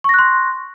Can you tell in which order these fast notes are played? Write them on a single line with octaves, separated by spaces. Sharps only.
C#6 A#6 F#6 C6